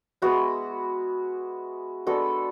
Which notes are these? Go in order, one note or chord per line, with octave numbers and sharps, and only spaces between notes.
G#3 B3 E4 F#4
G#3 B3 D4 F#4 A4